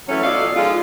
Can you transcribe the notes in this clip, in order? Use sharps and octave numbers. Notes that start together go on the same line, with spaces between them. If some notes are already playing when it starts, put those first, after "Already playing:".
E3 F#3 A3 C#4
B2 F4 A4 D5 D#5 F5
F3 G#3 D#4 F4